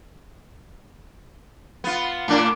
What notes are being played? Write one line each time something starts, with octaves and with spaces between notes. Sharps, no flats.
B3 F4
A2 D4